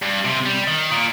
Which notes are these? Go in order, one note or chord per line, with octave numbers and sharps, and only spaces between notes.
G2
C3
G3
D#3
A#2